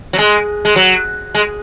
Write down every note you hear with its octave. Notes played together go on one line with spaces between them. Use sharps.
F#3
G#3
G#3
F#3
G#3